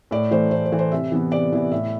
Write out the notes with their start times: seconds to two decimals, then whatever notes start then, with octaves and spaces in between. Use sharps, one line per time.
0.11 A2 D5
0.31 E3 A3 C5
0.51 A2 C5
0.66 C5
0.72 E3 A3
0.79 C5
0.92 C3 E5
1.12 E3 B3 E4
1.32 C3 D5
1.52 E3 B3 E4
1.71 A2 E5